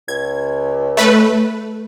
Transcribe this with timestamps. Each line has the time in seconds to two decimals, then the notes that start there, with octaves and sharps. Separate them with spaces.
0.08 C#2 G#6
0.97 A3 B4